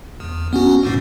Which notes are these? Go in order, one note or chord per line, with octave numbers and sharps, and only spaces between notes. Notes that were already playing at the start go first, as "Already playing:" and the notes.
E2
B3 C#4 F#4
D#2 G#2 B2